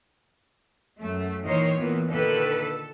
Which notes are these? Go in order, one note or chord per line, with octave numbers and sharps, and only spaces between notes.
F#2 A3
A#2 D#3 E3 D#4 C5 C#5
A#2 E3 B3
A#2 D3 D#3 A4 B4
A4